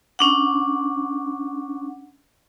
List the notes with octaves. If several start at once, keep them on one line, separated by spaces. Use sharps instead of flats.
C#4 D4 F#5